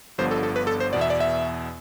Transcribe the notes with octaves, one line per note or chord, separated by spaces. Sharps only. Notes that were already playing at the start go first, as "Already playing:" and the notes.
G1 G2 D3 F3 B3 C5
A4
A4
B4
A4
C5
E2 B2 B3 D5
E5
D5
E5